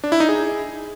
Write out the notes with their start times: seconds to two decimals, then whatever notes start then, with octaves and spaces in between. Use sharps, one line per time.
0.04 D4
0.12 E4
0.20 D#4
0.29 G#4